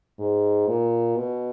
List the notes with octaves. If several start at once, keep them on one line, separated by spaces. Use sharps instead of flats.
G#2
A#2
B2